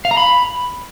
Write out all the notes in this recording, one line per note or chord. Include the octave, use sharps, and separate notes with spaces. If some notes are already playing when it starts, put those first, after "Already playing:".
F5
A#5
B5